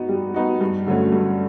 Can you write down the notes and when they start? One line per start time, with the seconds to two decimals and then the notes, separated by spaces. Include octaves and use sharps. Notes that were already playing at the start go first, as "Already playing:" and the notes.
Already playing: B3 D#4 F#4
0.09 G3
0.34 B3 D#4 F#4
0.61 G2
0.87 D3 F#3 A3 C#4
1.12 G2